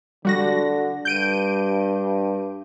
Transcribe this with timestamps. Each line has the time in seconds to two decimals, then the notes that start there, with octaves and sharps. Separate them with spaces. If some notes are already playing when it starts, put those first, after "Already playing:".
0.25 D3 G3 F#4 A#6
1.05 G2 G6 D7 D#7